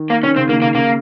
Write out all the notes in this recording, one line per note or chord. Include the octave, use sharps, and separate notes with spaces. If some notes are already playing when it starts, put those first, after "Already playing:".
Already playing: D#3
A#3
D#3 C#4
C#3 C4
D#3 A#3
C#3 A#3
C#3 A#3